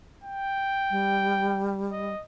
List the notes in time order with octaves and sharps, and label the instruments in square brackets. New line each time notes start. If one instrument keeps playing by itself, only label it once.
[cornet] G5
[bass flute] G3
[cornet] D#5